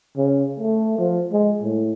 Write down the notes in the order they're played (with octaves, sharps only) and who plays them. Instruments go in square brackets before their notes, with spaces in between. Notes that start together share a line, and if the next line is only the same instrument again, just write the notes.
[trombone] C#3
A3
F3
G#3
A2